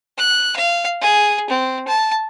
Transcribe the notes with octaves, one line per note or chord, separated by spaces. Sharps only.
F#6
F5
G#4
C4
A5